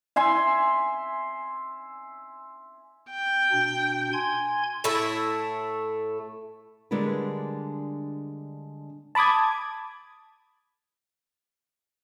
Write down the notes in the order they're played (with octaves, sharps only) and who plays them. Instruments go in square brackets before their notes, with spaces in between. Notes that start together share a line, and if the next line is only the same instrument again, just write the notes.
[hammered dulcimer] E5 G#5 C6
[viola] G5
[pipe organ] B2 D4
G#5 C6 G#6
[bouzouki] A2 A3 E4
[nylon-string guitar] D3 G3 G#3 D4 A#4 B4
[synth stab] A5 B5 D6 D#6 G#6